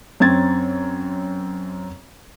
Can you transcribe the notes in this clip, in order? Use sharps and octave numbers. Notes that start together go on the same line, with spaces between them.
F#2 C4 C#5 A#5 G#6 A6